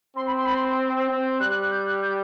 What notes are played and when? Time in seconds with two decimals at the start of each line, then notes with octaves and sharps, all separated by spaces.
0.16 C4 C6
0.26 B5
0.37 C6
0.45 B5
0.54 C6
1.08 C4
1.40 G3 F#6
1.50 F#6
1.61 F#6
1.70 G6
1.86 F#6
2.02 G6